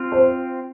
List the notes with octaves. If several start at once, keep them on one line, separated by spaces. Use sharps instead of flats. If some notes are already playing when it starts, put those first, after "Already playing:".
Already playing: C4 F4
C5